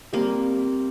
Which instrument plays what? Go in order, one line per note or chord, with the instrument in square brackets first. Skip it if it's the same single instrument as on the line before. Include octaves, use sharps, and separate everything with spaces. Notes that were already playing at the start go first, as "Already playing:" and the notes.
[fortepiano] G3 C4 G4 [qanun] A#3